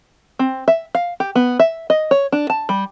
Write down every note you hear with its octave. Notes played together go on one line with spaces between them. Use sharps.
C4
E5
F5
G4
B3
E5
D#5
C#5
D4
A5
G3